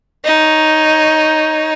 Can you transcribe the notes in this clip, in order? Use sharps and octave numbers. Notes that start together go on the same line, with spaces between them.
D#4 C#5